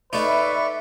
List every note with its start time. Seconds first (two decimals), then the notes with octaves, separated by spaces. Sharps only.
0.13 A3 D#4 B4 D5 E5 C#6